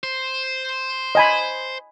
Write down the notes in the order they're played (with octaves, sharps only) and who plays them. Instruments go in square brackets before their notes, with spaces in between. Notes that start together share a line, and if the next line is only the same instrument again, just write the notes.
[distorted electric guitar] C5
[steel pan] D#5 G#5 B5